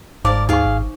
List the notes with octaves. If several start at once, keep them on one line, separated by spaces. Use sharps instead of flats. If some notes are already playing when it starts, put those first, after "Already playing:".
G1 G#2 A#4 C5 D5 F5 A5 D6
D2 D#4 G#4 F5 G#5 C#6
G#1